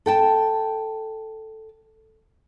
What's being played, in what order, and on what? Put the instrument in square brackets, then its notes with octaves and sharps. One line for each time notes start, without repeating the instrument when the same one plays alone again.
[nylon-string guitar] A4 G5 A5